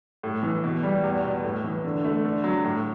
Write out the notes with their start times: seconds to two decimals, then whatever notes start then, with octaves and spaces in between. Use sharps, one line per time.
0.23 A2
0.43 E3
0.64 B2
0.83 G3
1.04 E2
1.24 B2
1.44 A2
1.64 E3
1.84 D3
2.04 A3
2.24 D3
2.44 F#3
2.64 A2